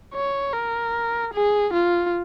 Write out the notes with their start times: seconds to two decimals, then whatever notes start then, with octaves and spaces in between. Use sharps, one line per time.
0.14 C#5
0.53 A#4
1.34 G#4
1.74 F4